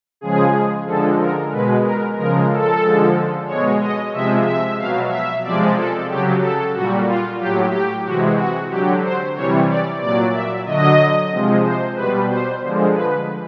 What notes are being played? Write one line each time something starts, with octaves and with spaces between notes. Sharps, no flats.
C#3 F3 G#3 G#4
D3 F3 G#3 A4
A#4
B2 G#3 B4
A#4
C#3 F3 G#3 A#4
A4
D3 F3 G#3
B2 G#3 C#5
D#5
C3 F3 G#3 E5
E5
B2 F#3 F5
E5
C3 F3 G#3 D5
A4
C#3 F#3 G4
A4
A#2 G3 F#4
F4
A2 F#3 G4
G4
C3 E3 G#3 F#4
F#4
D3 F#3 G4
C5
C3 E3 G3 C#5
D5
A#2 F#3 D5
E5
D3 F#3 D#5
C3 F3 G#3
C5
B2 G3 B4
C5
D3 F3 G#3
B4